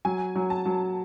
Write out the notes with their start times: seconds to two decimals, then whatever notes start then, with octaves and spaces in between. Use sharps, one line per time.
0.05 F#3 G#5
0.36 F#3
0.50 A5
0.66 F#3